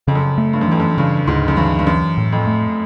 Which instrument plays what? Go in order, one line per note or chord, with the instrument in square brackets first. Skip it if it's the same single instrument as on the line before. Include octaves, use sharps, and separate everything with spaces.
[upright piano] F2 [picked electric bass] C#3
[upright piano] F#2
F2
[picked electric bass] A3
[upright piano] G2
F#2
[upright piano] F2 [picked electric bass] E3
[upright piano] F#2
[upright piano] G2 [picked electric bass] C#3
[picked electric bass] D2 [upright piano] G#2
[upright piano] F#2
[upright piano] G2 [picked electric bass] E3
[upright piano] G2
[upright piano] F#2 [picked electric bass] E3
[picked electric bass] A2
[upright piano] F2
[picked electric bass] A3